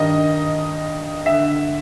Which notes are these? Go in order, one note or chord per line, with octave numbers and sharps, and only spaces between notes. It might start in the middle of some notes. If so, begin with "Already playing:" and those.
Already playing: G2 D#3 D#5
D3 E5